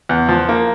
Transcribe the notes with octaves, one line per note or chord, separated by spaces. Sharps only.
E2
F3
A#3